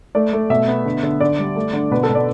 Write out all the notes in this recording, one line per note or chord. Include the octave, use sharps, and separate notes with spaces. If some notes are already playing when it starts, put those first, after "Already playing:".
A3 D5
A3
B2 E5
B3
D3
D3
D3 D5
G3
A3
D3
B2 B4
A4
B2
D5